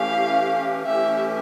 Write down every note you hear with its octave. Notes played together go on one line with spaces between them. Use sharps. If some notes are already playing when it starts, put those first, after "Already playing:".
Already playing: E3 A3 C#4 G4 F5
E3 A3 C#4 G4 E5